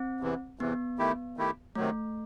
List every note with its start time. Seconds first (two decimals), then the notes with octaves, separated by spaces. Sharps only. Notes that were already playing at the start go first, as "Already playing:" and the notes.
Already playing: C4
0.20 E2 C3 E3
0.59 E2 C3 E3 B3
0.98 D#3 A3 E4 G4
1.37 D#3 A3 E4 G4
1.75 C3 D#3 F#3 A3